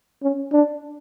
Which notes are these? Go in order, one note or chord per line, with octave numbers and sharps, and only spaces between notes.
C#4
D4